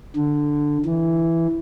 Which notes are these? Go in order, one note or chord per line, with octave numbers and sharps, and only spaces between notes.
D3
E3